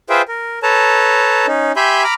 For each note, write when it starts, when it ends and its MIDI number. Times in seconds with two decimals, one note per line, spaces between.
0.10 0.22 65
0.10 0.22 68
0.10 0.22 71
0.10 0.22 72
0.10 0.22 76
0.10 0.22 79
0.28 0.59 70
0.63 1.46 69
0.63 1.46 71
0.63 1.46 73
0.63 1.46 81
0.63 1.46 82
1.47 1.72 61
1.47 1.72 63
1.76 2.04 67
1.76 2.04 76
1.76 2.04 80
1.76 2.04 83
1.76 2.04 84
1.76 2.04 91
2.04 2.14 82
2.04 2.14 83
2.04 2.14 86
2.04 2.14 89